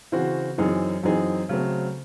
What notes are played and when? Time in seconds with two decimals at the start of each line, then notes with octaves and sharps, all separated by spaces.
0.12 C#3 E3 C4 F#4 C5
0.58 F#2 E3 C4 D#4 G#4
1.04 F#2 E3 C4 D#4 G#4
1.49 C#3 F#3 A3 C4